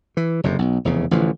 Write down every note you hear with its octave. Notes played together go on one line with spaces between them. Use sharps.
E3
F#1 F2 C3
B1
F1 E2 C#3
A1 D3 E3 F3